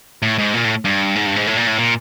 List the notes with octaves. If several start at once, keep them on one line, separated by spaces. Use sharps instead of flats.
A2
G#2
A#2
A2
G2
G#2
G2
G#2
A2
A#2
A2
A#2